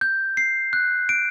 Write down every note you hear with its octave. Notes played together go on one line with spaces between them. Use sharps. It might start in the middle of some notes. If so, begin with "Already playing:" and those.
G6
C7
F#6
D7